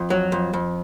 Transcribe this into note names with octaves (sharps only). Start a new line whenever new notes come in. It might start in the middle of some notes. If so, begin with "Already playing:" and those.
Already playing: F2
F#3
F2
F2